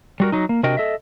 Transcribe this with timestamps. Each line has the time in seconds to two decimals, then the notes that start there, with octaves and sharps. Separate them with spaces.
0.20 G3 F#4 A#4
0.32 F#3 D#4
0.49 A#3
0.63 C3 D4 F#4 A#4 D#5 G5
0.77 A4 D#5 E5